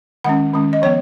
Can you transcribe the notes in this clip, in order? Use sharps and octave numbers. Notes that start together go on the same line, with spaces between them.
D#3 G#3 C#4 F#5
D#3 G#3 C#4
D#5
F3 B3 C#5